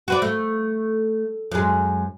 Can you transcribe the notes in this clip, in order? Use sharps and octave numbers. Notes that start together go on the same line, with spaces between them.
F#4 B4 D5
A3
F#2 G#3